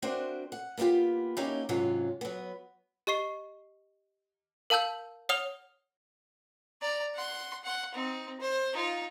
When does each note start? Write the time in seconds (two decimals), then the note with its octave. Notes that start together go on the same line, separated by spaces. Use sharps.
0.02 C4 D4 F#4 A#4 C5 E5
0.52 F#5
0.77 A#3 B3 D4 F4 G4
1.37 A#3 C#4 D#4 E4 G4
1.69 G#2 C3 F#3 C#4 F4
2.21 F#3 B3
3.07 G4 D#5 C#6 C7
4.70 A#4 F5 A5 E6 G6 F#7
5.29 C#5 F#5 D#6 F6 F7 G7
6.81 D5 A#5
7.14 F#5 C6
7.63 F#5 C6
7.94 C4 D#4
8.40 C5
8.73 D#4 F4